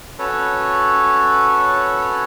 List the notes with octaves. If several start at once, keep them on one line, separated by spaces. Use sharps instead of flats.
C#4 F#4 A4 B4 C#5